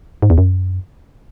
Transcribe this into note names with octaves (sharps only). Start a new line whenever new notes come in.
G#2
E2
F#2